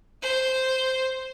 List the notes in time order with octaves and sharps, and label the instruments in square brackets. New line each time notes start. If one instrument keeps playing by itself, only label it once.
[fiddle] C5